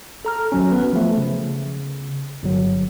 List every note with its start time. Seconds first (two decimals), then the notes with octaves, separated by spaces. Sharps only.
0.25 A4 A#5 F6
0.52 G#1 F#3 C#4
0.71 B3 B4
0.93 F3 A3
1.18 C#3
2.43 G1 F#3